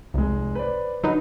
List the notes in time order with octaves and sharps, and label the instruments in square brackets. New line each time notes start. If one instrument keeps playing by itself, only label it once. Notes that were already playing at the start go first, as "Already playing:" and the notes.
[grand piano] F1 G#3 [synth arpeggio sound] C2
[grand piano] B4 C5 D5
[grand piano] D3 [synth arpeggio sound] F#3 D#4 B4